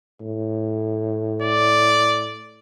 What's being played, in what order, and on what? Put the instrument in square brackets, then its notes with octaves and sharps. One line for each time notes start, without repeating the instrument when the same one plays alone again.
[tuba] A2
[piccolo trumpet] D5